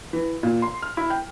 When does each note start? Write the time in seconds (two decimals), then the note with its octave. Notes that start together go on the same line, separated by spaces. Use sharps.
0.13 E3
0.43 A#2
0.62 C6
0.82 F6
0.97 E4
1.10 G5